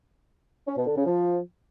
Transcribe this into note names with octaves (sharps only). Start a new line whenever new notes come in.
C#4
B2
D3
C#3
F3